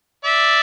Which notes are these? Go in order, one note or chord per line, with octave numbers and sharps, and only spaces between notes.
D5 E5